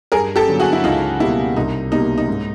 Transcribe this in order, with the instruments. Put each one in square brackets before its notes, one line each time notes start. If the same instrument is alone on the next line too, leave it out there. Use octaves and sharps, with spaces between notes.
[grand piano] G2 [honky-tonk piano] G#4 A#4
[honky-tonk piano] G4 A4
[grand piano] D3 F#3 B3
[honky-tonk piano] F#4 G#4
E4
[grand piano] C#2 [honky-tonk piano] D#4 F4
[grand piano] B2 G3 A#3 [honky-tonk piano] E4
[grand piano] C2 [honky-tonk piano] D#4
[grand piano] B2 G3 A#3 [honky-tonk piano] D#4
[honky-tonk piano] D#4
[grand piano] G#2